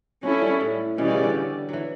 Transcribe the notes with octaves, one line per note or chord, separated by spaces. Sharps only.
F#3 C#4 E4 A4
G3
A2
B2 E3 G3 C#4 G4 D5
C#3
D3
E3 F#3